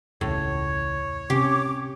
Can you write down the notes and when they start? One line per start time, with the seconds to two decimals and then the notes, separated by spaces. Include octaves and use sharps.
0.21 E1 C#2 A2 C#5
1.30 C3 C#4 G4 D6